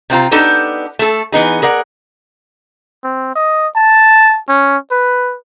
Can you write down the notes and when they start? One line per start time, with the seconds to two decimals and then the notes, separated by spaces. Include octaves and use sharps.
0.10 C3 C4 F4 A#5
0.31 B3 D4 D#4 G4 A4
0.99 A3 A4
1.32 E3 B3 D#4 G#4
1.62 G#4 A#4 D5 F#5
3.04 C4
3.36 D#5
3.76 A5
4.49 C#4
4.91 B4